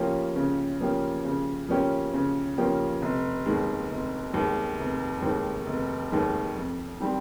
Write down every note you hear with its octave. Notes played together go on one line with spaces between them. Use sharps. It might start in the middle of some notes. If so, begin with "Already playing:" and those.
Already playing: C#3 F3 A#3 C#4 G4
C#3
F3 A#3 C#4 G4
C#3
F3 A#3 C#4 G4
C#3
F3 A#3 C#4 G4
F1
D#2 D#3 G#3
F1
D#2 D#3 G#3
F1
D#2 D#3 G#3
F1
D#2 D#3 G#3
F2
D#3 G3 C4 G4